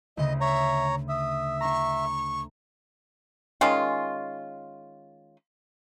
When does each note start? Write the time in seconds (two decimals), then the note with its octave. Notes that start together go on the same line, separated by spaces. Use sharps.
0.17 D2 C#3 D#5
0.41 C#5 E5 A#5
1.09 E5 D#6
1.61 D4 A#5 C#6
3.61 D#3 G#3 C#4 F4